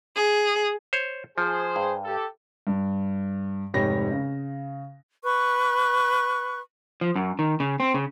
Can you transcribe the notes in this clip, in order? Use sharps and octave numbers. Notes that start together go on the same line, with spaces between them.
G#4
C5 C#5
F3 G#4 C5
G2
G4 A4
G2
F1 G#2 G4 C#5 B5 A#6
C#3
B4 C#6 F#6
F3
F#2
D#3
C#3
C4
C#3